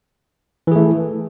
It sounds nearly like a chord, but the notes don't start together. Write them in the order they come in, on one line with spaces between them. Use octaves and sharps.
E3 G#4 A3